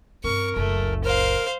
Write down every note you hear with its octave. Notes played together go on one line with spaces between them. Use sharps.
G2 C4 A#4 C#6
F#1 C#2 A3
A#4 C5 F5